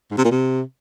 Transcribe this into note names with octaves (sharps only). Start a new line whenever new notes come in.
G#2
C3
A#2
C3